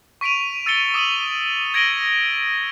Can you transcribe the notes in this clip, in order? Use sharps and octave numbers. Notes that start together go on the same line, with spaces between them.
C#6 B6 D7 D#7 F7
E6 A6 C#7 G7
D6 D#6 D#7 F7 F#7
G#6 A#6 D7 D#7 F#7 G7